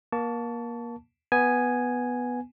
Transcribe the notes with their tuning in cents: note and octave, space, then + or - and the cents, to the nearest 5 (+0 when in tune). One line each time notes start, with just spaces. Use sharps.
A#3 +25 A5 +0 C#6 +40
B3 +0 G#5 +0